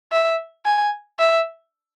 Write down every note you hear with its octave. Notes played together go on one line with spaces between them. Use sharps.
E5
G#5
E5